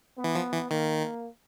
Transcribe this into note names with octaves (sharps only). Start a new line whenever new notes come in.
B3
E3
F3
E3
D#3 A#3